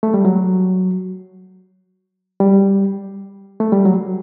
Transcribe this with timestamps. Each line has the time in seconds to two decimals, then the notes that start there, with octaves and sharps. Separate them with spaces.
0.03 A3
0.14 G3
0.25 F#3
2.40 G3
3.60 A3
3.72 G3
3.85 F#3